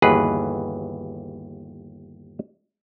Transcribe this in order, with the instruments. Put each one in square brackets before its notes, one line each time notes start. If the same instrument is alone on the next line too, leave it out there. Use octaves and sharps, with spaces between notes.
[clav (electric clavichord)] G1 D#2 E3 F#4 G#4 B4